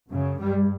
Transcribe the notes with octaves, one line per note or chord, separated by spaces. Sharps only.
F#2 C#3
G2 G3